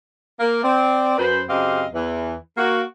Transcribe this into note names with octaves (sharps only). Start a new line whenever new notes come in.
A#3
C4 D5
F#2 B4 C5
F#2 C#3 C4 G4 D#5 F5
E2 E3
A#3 F#4